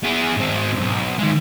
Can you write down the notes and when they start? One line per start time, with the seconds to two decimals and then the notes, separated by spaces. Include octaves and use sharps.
0.04 B3 G#4
0.37 G#2 C4
0.76 B1 G2
1.19 D#3 G#3